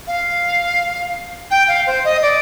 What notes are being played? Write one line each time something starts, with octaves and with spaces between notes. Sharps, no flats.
F5
G5
F5
C5
D#5
D5